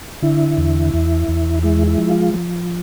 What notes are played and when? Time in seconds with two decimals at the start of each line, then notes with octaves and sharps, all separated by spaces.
0.22 D3 E4
0.57 E2
0.94 E2
1.28 E2
1.63 G#3 E4
1.87 E4
1.98 F3
2.10 F4
2.34 F3